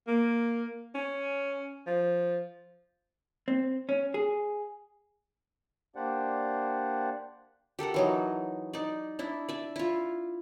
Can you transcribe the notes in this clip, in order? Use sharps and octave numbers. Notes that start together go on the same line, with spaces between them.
A#3
C#4
F3
C4
C#4
G#4
A#3 D4 G4 C5 D5 F#5
G4 A4 A#4 F#5
E3 F#3 D#4
D#4 D5
D4 E4
D5 E5
E4 F4